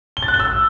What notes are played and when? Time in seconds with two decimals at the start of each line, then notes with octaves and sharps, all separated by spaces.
0.17 G7
0.22 A6
0.28 F#6
0.34 G7
0.40 E6